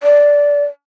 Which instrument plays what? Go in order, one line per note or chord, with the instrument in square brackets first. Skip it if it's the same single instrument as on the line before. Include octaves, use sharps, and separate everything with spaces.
[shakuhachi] D5